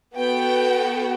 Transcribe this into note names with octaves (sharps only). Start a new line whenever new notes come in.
B3 F#4 A4 G5